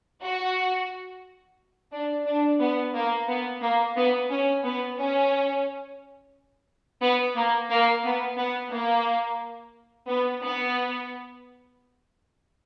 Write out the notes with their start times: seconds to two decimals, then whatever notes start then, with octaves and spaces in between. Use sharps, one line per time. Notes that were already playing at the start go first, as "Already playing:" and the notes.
0.22 F#4
1.92 D4
2.26 D4
2.60 B3
2.94 A#3
3.28 B3
3.62 A#3
3.95 B3
4.30 C#4
4.64 B3
4.98 C#4
7.01 B3
7.36 A#3
7.70 A#3
8.04 B3
8.37 B3
8.71 A#3
10.08 B3
10.41 B3